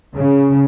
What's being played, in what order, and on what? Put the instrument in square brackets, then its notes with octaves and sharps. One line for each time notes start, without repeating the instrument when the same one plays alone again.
[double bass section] C#3